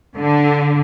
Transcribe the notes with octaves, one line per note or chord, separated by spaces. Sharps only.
D3